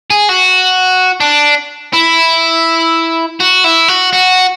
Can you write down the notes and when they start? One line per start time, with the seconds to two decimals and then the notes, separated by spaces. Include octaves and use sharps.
0.10 G#4
0.29 F#4
1.20 D4
1.93 E4
3.40 F#4
3.64 E4
3.88 F#4
4.13 F#4